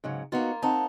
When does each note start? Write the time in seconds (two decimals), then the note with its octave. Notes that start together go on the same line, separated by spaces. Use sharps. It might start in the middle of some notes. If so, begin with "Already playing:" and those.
0.04 G#2 C#3 F#3
0.32 A#3 B3 D#4 F4 F#4
0.63 C4 D#4 F#5 A5